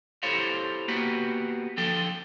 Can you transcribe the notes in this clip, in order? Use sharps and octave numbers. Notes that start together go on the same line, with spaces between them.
E4 G4 A4 C5 C#5 F5
A#3 B3 F#4 G4
D3 F3 A4 G5